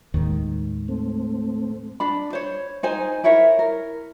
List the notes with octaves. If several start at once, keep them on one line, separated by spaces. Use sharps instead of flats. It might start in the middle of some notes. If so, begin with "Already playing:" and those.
D#2 A2 D#3 G#3
A3 C4
D4 B5
C5 C#5
D#4 C5 G#5
E4 A#4 C#5 E5
A#4